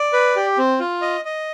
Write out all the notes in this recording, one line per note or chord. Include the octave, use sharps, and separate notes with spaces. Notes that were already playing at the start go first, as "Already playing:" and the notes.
Already playing: D5
B4
G4
C4
F4
D#5
D#5